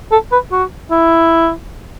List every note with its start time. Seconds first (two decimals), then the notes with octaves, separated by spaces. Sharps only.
0.12 A4
0.32 B4
0.52 F#4
0.91 E4